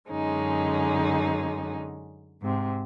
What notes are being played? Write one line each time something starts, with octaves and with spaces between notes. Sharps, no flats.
F#2 D3 G#3 C#4 D#4
G#2 C3